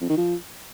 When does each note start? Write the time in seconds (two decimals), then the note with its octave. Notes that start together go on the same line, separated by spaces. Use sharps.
0.01 F2
0.09 D#3
0.17 F3